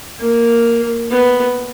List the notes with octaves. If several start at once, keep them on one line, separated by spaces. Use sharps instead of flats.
A#3
B3